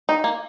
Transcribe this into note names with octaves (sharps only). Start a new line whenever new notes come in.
D#4
A#3